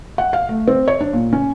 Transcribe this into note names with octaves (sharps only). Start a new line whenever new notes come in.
F#5
F5
A3
C4
C#5
D4
A#2
C#4